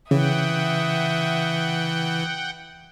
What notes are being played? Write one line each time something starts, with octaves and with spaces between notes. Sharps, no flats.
C#3 E3 E5 F#5 G5 D#6